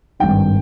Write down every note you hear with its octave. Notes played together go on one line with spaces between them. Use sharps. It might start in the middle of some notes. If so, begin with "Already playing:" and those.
G#1 G2 D#3 G5